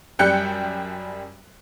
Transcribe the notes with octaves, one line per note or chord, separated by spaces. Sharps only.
F#2 G3 G5 F#6 C#7